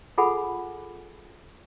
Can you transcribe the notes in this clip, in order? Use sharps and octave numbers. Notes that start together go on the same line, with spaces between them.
F4 G#4 A4 F#5 G#5 B5